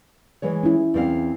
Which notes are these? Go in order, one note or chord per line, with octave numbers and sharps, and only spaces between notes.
E3 G#3 C#5
C#4 E4
E2 C4 F5